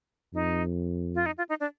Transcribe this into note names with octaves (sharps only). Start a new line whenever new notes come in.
F2 D#4
F4
D#4
F4
D#4
D4